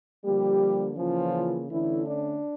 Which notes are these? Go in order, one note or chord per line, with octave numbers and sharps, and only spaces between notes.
D3 F3 G3 A#3 G4
C#3 E3 F3 A#3 C#4 F4
D3 E3 A3 C#4 E4
D4